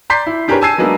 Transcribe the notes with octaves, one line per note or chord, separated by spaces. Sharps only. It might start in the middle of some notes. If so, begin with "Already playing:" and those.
D5 A#5 C6 G6 B6 C7
E4
D4 G4 G#4 A#4 B4 C#5
G#5 A5 E6 G#6 C7 D#7
F#3 G#3 A#3 B3 D4